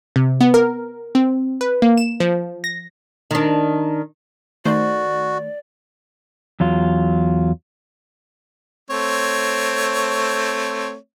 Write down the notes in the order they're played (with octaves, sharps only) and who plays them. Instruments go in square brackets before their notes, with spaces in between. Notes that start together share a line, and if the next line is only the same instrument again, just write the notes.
[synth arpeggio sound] C3
B3
A#4
C4
B4
A#3
E7
F3
A#6
[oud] D#3 D4
[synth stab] D#3 A3 C5 [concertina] F#4 [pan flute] D5
[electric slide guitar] E2 F#3 F4
[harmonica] A3 C4 C#5